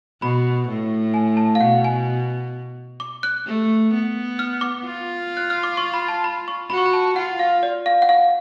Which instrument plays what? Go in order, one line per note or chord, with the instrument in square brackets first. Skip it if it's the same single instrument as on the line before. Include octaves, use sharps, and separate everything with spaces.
[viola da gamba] B2 [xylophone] B5
[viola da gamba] A2
[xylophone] G#5
A5
F5
[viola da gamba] B2 [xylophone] F#5
[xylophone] G#5
D6
F#6
[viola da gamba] A3
B3
[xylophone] F6
D6
[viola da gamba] F4
[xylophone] F#6
F6
D6
C#6
B5
A5
B5
C#6
[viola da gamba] F#4 [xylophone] B5
[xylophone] C#6
B5
A5
[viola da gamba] F4 [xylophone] F#5
[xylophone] F5
D5
F5
F#5
F5